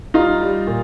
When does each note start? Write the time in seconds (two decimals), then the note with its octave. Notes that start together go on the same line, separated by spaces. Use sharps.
0.14 G3 D#4 F4
0.41 G3
0.67 A#2